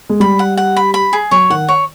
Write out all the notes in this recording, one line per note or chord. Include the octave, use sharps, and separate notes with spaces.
G#3
G3 B5
F#5
F#5
B5
B5
G#4
F#3 C#5
D#3 F#5
C#5